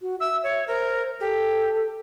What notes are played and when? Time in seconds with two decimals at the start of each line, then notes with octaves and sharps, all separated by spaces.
0.02 F#4
0.20 E5 E6
0.43 C#5
0.68 A#4 C5
1.20 G4 A4